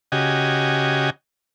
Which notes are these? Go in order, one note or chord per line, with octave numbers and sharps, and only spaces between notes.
C#3 F#4 G4 D#5 G#5